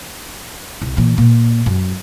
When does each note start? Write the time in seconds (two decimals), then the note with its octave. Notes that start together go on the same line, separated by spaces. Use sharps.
0.82 C2
0.97 A#2 E3
1.18 A#2
1.66 F#2